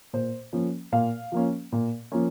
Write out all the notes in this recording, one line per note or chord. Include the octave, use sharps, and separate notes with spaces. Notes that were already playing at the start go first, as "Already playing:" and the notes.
A#2 C5
F3 A#3 C#4
A#2 F5
F3 A#3 C#4
A#2
F3 A#3 C#4